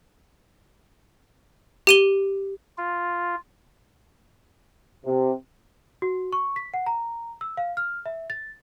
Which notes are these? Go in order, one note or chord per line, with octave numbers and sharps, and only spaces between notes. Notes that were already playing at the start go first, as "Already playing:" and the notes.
G4 D#7 G7
F4
C3
F#4
C#6
B6
F#5
A#5
E6
F5
F6
E5
A6